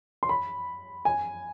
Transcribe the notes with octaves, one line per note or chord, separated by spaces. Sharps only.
C6
B5
G#5